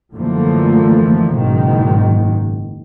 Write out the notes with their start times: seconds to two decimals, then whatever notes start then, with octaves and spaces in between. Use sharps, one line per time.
0.14 F#2 D3 E3 F3 A3 A#3
1.34 F#1 G#2 B2 D#3 G#3